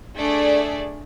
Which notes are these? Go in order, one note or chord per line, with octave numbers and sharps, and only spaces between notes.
A3 D4 G#4 D5